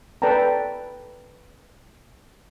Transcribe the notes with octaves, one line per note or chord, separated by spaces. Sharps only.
A4 B4 D5 G5 A5 A#5